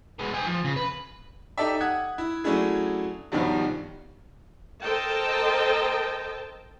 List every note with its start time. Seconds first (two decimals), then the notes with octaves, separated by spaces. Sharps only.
0.19 G#3 B3
0.34 G4 G#5
0.47 F3
0.65 C#3
0.76 B4
1.58 D#4 G4 A4 D5 E5
1.81 F#5 D#6 F#6 G#6
2.18 E4
2.44 F#3 A3 C#4 D4 E4 G#4
3.32 B1 G2 B2 D#3 F3 G3
4.84 A4 A#4 C5 D#5 G5 A5